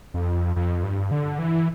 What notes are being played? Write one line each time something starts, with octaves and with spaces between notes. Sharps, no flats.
F2
F2
G2
D3
E3